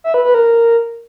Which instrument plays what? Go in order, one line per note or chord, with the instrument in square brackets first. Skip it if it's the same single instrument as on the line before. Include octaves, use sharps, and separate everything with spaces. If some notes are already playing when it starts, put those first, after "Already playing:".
[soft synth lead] E5
B4
B4
A#4